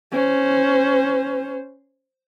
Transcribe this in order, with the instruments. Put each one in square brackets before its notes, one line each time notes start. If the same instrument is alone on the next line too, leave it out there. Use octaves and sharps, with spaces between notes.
[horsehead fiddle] C#4 C5